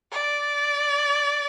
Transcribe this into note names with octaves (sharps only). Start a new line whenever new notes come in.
D5